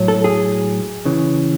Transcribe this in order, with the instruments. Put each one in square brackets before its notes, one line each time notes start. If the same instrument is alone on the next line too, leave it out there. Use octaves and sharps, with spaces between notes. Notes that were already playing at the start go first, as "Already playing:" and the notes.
Already playing: [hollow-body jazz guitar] A2 F#3
A4
G#4
C#3 E3